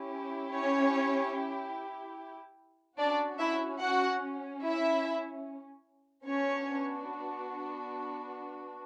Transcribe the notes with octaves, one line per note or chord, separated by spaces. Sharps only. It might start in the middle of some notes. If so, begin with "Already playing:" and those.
Already playing: C#4 E4 G4
C#4 C#5
C#4 D4 F#4 D5
E4 E5
F#4 F#5
E4 E5
B3 C#4 D4 F#4 C#5